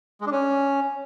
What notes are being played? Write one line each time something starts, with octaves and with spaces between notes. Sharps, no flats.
G#3
D4
C#4